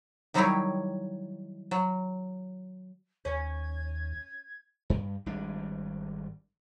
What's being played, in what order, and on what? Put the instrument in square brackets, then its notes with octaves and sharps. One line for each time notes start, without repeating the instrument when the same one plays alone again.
[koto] D#3 F#3 G3 D#4 E4 C#5
F#3
[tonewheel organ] D#2 [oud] C#4 [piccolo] G#6
[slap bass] G2
G#1 G3 D4